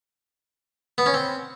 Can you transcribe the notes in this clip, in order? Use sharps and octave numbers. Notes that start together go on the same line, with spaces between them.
B3
C#4
C4